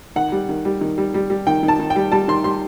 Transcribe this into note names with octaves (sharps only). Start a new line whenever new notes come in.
D#3 F#5
G3
D#3
G3
D#3
G3
G3
G3
D#3 G5
D#3
A5
D#3
G5
G3
G3 A5
D#3 C6
G3 C6